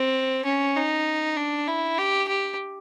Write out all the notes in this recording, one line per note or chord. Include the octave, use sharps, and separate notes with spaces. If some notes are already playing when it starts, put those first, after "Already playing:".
Already playing: C4
C#4
D#4
D4
E4
G4
G4